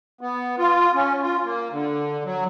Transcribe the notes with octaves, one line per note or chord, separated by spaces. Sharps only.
B3
F4
C#4
F4
A#3
D3
F#3